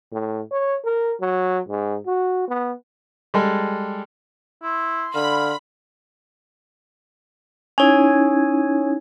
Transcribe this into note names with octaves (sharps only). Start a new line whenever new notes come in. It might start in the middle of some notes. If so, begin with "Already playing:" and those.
A2
C#5
A#4
F#3
G#2
F#4
B3
G3 G#3 A4
E4 C6
D3 F5 B5
C#4 D#4 E4 C#5 G#5